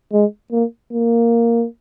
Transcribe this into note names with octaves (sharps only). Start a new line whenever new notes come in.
G#3
A#3
A#3